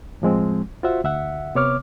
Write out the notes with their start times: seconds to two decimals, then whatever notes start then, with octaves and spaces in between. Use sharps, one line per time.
0.22 A2 F3 G#3 C4
0.83 F4 F#4 C5 E5 F#5
1.04 D2 E5 F#5
1.55 C3 B3 C#5 D6 F6